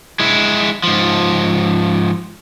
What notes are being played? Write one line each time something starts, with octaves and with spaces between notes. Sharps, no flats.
G#3 E4
G#2 F3